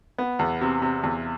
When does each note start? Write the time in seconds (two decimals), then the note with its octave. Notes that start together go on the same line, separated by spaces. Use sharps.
0.18 B3
0.39 E2
0.61 C3
0.82 C3
1.03 E2